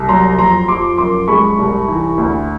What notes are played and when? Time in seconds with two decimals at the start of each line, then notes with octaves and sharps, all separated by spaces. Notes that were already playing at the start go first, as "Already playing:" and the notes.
Already playing: C2
0.09 F#3 A#5 C6
0.39 F2 A#5 C6
0.68 F3 C6 D6
0.98 F#2 C6 D6
1.28 G#3 B5 C#6
1.58 C2
1.88 E3
2.18 D2